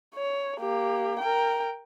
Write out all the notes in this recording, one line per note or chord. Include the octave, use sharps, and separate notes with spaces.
C#5
A#3 G4
A#4 G5